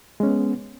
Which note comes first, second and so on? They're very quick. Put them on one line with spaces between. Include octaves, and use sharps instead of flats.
G#3 C#4 B3